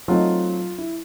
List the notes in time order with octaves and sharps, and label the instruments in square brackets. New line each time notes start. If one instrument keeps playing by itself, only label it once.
[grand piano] F#3 A3 C4 D#4 [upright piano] F4
[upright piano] E4